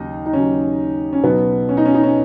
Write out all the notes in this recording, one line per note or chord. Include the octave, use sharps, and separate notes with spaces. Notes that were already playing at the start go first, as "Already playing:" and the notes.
Already playing: D#2 C#3 F#3 D#4
D#4
D#2 C#3 F#3 C#4
C#4
B1 B2 F#3 B3
C#4
D#4
C#4
D#4
C#4